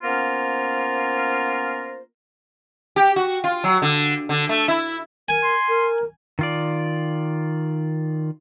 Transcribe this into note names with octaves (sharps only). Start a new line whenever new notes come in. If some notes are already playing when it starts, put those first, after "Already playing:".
A#3 B3 C#4 F4 A#4 C5
G4
F#4
F4
F#3
D3
D3
A3
E4
A#4 G#5
C6
A#4
D#3 F4 D5